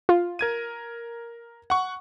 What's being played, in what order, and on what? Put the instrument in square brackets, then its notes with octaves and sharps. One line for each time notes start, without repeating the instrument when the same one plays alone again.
[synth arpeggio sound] F4
[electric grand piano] A#4 G#6 D#7
F#5 C#6